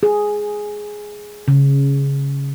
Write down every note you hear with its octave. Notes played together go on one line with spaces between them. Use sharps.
G#4
C#3